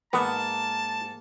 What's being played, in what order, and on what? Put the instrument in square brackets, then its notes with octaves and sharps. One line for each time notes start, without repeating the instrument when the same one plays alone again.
[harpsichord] G#2 G#5 [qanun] A#3 [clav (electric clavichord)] B3 [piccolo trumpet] A5